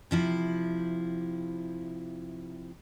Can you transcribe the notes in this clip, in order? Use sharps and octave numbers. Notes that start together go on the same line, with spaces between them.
C3 F3 E4